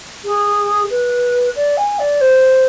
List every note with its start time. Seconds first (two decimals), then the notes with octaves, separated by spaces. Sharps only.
0.25 G#4
0.90 B4
1.55 D5
1.77 G#5
1.99 D5
2.20 C5